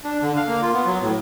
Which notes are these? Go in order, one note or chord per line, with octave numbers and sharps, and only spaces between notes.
D4
D3
F5
A#3
F4
B3
F#3
A2